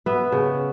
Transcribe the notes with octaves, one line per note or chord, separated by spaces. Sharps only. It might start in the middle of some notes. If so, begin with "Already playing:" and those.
B3 E5
C#3